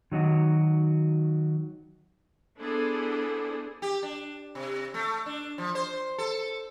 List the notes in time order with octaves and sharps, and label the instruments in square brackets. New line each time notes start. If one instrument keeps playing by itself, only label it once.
[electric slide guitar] D#3 F#3 D#4 F#4
[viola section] B3 D4 E4 G#4 A4 C5
[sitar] G4
D4
C3
A3
D4
F3
C5
A4